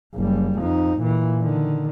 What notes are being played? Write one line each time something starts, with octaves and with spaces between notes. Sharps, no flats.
F#1 G3
F2 D#4
A#2 E3
D3 D#3